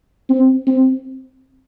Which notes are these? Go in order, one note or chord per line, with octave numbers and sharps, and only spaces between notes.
C4
C4